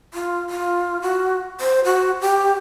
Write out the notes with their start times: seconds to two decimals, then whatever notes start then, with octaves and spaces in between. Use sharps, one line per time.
0.14 F4
0.50 F4
1.02 F#4
1.61 C5
1.85 F#4
2.21 G4